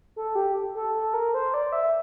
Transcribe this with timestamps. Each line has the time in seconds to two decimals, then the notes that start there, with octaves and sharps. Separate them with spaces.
0.16 A4
0.35 G4
0.75 A4
0.95 A4
1.14 A#4
1.34 C5
1.54 D5
1.72 E5